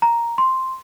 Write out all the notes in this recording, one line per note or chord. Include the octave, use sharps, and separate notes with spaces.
A#5
C6